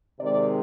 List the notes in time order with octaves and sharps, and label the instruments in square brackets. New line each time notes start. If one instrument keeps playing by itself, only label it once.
[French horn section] C3 D#3 G#3 D5